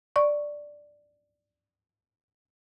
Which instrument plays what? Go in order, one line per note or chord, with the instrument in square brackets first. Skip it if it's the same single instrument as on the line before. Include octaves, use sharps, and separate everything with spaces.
[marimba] D5 C#6